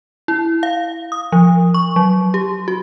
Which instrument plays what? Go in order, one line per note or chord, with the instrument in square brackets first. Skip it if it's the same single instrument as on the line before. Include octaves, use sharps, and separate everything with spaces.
[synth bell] E4
F5
D#6
F3
C#6
F#3
G4
F#4